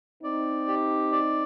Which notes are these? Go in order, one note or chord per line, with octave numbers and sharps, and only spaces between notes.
C4 D#4 D5
G4
D5